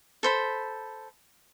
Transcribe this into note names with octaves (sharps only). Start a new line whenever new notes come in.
A4 C5 B5